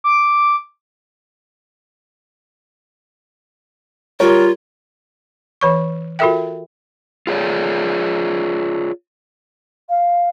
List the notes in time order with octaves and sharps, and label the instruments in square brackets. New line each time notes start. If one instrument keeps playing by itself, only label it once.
[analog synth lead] D6
[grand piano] G3 A#4 C#5 [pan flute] F4
[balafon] E3 C#5 C#6
F4 F#4 A4 A#4 E5 G5
[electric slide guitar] F4 G#4 C#5 D5
[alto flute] F5